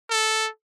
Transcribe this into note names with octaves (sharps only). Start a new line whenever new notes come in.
A4